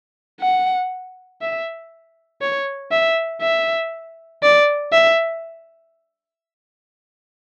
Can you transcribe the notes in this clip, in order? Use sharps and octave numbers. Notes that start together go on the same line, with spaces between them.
F#5
E5
C#5
E5
E5
D5
E5